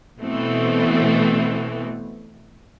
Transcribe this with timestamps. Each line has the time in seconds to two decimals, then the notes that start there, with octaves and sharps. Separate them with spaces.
0.21 B2 E3 A3 B3 C4